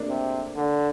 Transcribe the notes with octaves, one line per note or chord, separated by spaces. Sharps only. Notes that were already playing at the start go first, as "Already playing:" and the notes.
Already playing: A3 A#3 D4
C3
D3